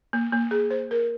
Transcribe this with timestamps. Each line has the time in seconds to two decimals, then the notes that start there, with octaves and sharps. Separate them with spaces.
0.13 A#3
0.32 A#3
0.51 G#4
0.70 C5
0.91 A#4